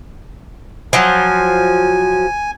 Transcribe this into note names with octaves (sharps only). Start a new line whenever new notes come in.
F3 F#3 G#5